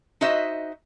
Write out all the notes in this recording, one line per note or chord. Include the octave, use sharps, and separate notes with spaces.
D#4 F#4 C5 D#5 E5